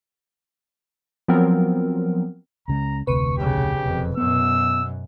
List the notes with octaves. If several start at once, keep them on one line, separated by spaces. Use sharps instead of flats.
F3 F#3 B3 C4 A#4
C#2 C#3 G#3 A#5
F1 D2 C3 B4 C#6
B1 C#3 G4
E1 F2
F#2 B2 B3 E6